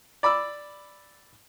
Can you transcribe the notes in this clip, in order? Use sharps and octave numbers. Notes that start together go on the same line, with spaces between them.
D5 B5 D6 E6